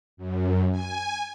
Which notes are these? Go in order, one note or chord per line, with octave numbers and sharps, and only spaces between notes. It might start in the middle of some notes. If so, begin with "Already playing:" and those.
F#2
G#5